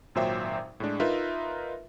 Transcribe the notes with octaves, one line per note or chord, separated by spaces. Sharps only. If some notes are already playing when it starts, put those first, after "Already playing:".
G#1 A#2 F#3 C5 E5 G5
A2 G#3 D4
D#4 F4 A#4 B4 E5